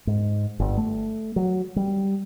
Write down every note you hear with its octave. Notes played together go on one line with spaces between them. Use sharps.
G#2
G1
A3
F#3
G3